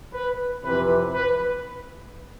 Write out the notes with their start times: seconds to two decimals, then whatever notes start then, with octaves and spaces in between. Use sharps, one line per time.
0.14 B4
0.64 F2 C3 E3 B4
1.14 B4